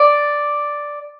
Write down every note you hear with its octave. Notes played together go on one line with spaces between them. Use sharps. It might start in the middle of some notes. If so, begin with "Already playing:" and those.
Already playing: D5